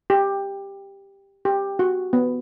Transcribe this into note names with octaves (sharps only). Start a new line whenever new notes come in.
G4
G4
F#4
B3